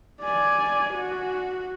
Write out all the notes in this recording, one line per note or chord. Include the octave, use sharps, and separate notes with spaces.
D5 G#5
F#4